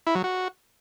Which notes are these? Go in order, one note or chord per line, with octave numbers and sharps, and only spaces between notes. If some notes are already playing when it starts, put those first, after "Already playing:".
E4
F#3
F#4